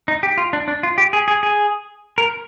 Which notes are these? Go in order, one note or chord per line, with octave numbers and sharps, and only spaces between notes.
D#4
G4
F4
D4
D4
F4
G4
G#4
G#4
G#4
A#4